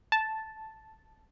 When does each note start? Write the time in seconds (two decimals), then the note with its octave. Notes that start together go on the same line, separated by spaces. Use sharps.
0.12 A5